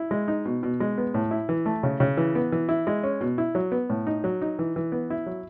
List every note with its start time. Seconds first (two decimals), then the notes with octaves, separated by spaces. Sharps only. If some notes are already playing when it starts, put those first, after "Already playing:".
Already playing: E4
0.11 G#3
0.28 D#4
0.46 B2
0.63 B2
0.80 G#3
0.98 B3
1.14 A2
1.31 E4
1.49 E3
1.66 A3
1.83 C#3
2.00 C#3
2.17 E3
2.35 B3
2.52 E3
2.69 E4
2.87 G#3
3.04 C#4
3.21 B2
3.38 E4
3.55 F#3
3.72 B3
3.90 A2
4.07 D#4
4.24 F#3
4.42 D#4
4.59 E3
4.76 E3
4.92 B3
5.10 E4
5.26 F#3